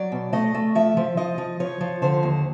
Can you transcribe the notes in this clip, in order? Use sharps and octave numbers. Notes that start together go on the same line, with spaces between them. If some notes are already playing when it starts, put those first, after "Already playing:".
Already playing: F#3 D5
B2
A3 D#5
A3
F3 E5
F3
F3 D#5
F3
F3 C#5
F3
D3 C5
D#2